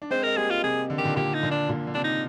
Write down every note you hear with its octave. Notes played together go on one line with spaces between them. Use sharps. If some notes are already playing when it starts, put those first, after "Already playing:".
D4
G#3 C4 C5
G#3 A#4
G3 A#3 G#4
F4
C3 G#4
D3
D#3 G4
A#2 D3
A#2 D3 G4
D#4
A#2 D3
D4
A#2
D3
C3 D4
D#4